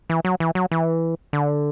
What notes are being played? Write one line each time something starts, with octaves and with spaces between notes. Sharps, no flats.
E3
F#3
E3
F#3
E3
D3